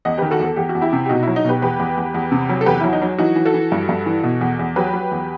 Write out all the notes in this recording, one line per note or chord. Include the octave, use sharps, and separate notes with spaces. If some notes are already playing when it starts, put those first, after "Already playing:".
E2 D#5 F#5
D#3 G4 B4
F#4 A4
E2
A4
E2 G4
F#4
E2
E4 G4
C3
G4
B2 D#4 F#4
F#3 E4
D#4
B2 G4 B4
E2 G4 B4
E2
E2
E2
C3
F#3
A4
E2 G4 B4
F#3 E4
D#4
F#3
E3 D#4 F#4
E3
F#4 A4
E3
G2
G2
E3
B2
E2
E2
F#3 G4 B4
F#3
E2